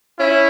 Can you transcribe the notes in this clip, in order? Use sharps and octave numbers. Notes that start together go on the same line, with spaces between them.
C#4 E4